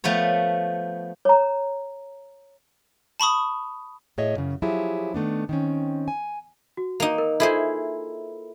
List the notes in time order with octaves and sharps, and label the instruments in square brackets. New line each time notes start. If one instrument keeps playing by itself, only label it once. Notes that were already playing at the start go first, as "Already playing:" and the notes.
[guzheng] F3 A3 B3 C#5
[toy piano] C#5 A#5
[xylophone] A5 B5 C#6 D#6
[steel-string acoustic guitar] A2 G#4 C#5 D#5 E5
F#2 C#3
F3 F#3 E4 F4 G4 G#4
D#3 A3 B3 D4
D#3 C4 C#4
G#5
[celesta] F#4
[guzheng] A#3 D#4
[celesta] A#4
[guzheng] E4 G#4 C5 [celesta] F4 A4 E5